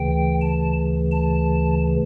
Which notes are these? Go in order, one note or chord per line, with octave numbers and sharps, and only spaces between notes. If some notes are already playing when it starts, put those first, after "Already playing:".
Already playing: D2 C#3 E3 G5
A5
A5